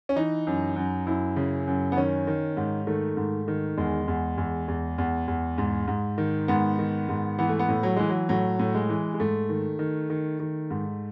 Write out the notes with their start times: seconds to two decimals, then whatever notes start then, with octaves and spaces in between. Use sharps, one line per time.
0.09 C#4
0.16 E3 D#4
0.47 F#2
0.76 F#2
1.06 F#2 E4
1.36 C#3
1.67 F#2
1.92 B3
1.97 D#3 C#4
2.27 D#3
2.57 G#2
2.87 D#3 A3
3.17 G#2
3.48 D#3
3.77 E2 G#3
4.08 E2
4.38 E2
4.68 E2
4.98 E2
5.28 E2
5.58 G#2
5.88 G#2
6.18 D#3
6.48 G#2 B3
6.79 D#3
7.09 G#2
7.39 E3 B3
7.49 A3
7.59 B3
7.69 A2
7.83 F#3
7.96 E3 G#3
8.09 F#3
8.29 A2 F#3
8.59 A2
8.75 G#3
8.89 E3
9.14 G#3
9.20 G#2 A3
9.49 D#3
9.79 D#3
10.10 D#3
10.40 D#3
10.70 G#2